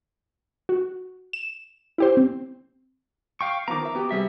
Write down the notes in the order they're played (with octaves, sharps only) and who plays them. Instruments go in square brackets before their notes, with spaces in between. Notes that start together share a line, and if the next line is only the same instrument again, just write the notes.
[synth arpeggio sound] F#4
E7
E4 G4 C5
C4
[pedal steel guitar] F5 G5 C#6
[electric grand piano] D#3 F3 B3 [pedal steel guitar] A#5 D6
[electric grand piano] A#4 E5
B3 F#4 G4
[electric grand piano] C3 G3 G#4 [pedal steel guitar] E5